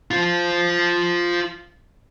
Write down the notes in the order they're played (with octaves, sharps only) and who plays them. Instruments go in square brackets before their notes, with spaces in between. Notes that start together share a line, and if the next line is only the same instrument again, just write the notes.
[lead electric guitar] F4 C5